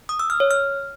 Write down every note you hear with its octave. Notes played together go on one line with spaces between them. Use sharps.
D#6
E6
F6
C#5
F6